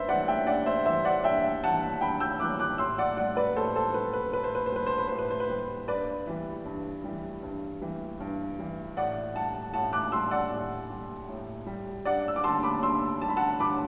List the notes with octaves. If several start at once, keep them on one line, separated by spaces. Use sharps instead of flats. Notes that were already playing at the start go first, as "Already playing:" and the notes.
Already playing: G2 B4 C5 E5
E3 G3 D5 F#5
E5 G5
G2 D5 F#5
C5 E5
E3 G3 C5 E5
D5 F#5
G2 E5 G5
E3 G3 F#5 A5
G2 G5 B5
E6 G6
E3 G3 D6 F#6
D6 F#6
A2 C6 E6
D5 F#5
G3 D5 F#5
B4 D5
A2 A4 C5
A4 C5
G3 B4
B4
A2 B4
C5
B4
C5
G3 B4
C5
B4
A2 C5
B4
C5
B4
G3
G2 B4 D5
E3 G3
G2
E3 G3
G2
E3 G3
G2
E3 G3
A2 D5 F#5
G3 F#5 A5
A2 F#5 A5
D6 F#6
G3 C6 E6
D5 F#5
A2
G3
A2
G3
G2 D5 F#5
E6
D6
D3 G3 A5 C6
B5 D6
G2 C6 E6
D3 G3 A5
B5
F#5 A5
G2 B5 D6